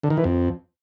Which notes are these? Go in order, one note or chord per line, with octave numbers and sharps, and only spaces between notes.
D3
D#3
E3
F2